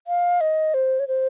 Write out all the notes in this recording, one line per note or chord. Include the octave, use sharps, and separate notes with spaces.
F5
D#5
C5
C#5
C5